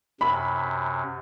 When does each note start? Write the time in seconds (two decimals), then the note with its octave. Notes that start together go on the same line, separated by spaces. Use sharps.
0.21 F#2 C3 B5